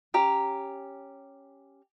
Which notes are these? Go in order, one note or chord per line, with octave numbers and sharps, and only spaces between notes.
C#4 G4 A#5